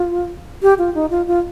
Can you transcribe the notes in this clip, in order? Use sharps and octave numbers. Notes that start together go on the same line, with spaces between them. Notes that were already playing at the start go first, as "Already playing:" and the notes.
Already playing: F4
G4
F4
D#4
F4
F4